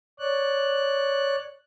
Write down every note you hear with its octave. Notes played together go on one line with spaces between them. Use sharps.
C#5 D5 F#6